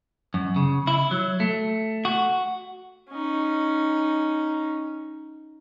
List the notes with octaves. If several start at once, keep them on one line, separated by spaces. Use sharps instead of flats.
F#2
C#3
E4
F#3
A3
F#4
C#4 D#4